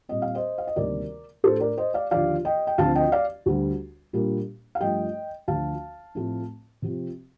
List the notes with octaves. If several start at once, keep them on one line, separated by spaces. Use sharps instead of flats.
A#2 G3 C4 D#5
F5
C5 D#5
F5
D#5
D2 C3 D#3 G3 A#3 A#4 D5
A2 A3 D4 A4 C5
A#4 D5
C5 D#5
D5 F5
D#2 D3 F3 D5 F5
D#5 G5
G5
D2 D3 F3 C4 F5 A5
D#5 G5
D5 F5
D2 D3 G3
A#2 G3 A#3 D4
F5
G2 F3 A3 D#5 G5
D2 D3 F3 F5 A5
A2 F3 A3 C4
C3 F3 C4